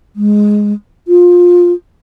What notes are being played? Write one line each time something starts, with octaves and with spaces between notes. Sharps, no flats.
G#3
F4